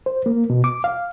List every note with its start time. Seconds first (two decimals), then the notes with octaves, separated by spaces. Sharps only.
0.06 C5
0.26 A#3
0.50 B2
0.64 D6
0.84 F5